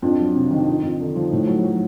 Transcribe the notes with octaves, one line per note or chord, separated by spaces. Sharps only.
F2 D4
F#3
C3
D#3
F2 D#4
F2
D3
F3
A2
F#3
F#3